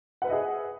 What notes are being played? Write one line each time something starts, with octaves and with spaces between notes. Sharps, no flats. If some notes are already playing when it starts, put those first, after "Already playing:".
G#4 B4 D#5 E5 F#5